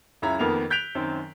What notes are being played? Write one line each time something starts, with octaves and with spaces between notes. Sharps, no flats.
C#2 F#2 E4 A#5 G#6
F2 D#3 A#3 B3 A#4 F7
F#6 G6 B6 D7 F7
F#2 D#3 C4